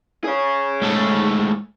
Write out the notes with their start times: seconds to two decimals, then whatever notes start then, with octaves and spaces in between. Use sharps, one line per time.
0.24 G#4 C#5
0.82 G#2 A3